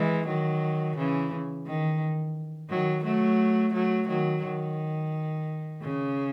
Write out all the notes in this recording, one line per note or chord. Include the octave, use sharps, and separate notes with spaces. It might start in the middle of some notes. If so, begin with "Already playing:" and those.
Already playing: E3 G#3
D#3 F#3
C#3 E3
D#3
D#3 F#3
F#3 A3
F#3 A3
D#3 F#3
D#3
C#3